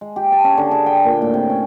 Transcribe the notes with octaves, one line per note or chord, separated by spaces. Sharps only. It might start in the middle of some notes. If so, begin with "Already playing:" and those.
G#3
G4
A5
C#4
D3
G#4
G5
A#2
A2
C3
C#4